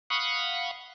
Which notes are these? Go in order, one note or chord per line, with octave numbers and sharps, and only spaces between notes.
F5 F#5 B5 C#6 D#6